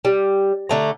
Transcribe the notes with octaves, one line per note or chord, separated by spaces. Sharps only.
G3
D3 A3 A#5